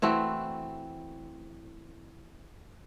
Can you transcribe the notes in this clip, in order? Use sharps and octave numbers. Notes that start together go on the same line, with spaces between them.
E3 A3 C4 F#4